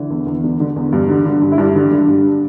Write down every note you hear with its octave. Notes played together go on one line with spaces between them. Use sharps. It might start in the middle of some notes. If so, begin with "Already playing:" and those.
Already playing: D3 E3
E2
E2
D3
D3
E2
G2
D3
D3
G2
E4
G2 D4
D3
D3
G2